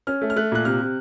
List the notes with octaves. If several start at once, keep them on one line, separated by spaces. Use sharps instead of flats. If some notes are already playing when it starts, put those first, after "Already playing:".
C#4 F6
A3
F6
A3 F#6
A#2 F#6
C3 F6
C3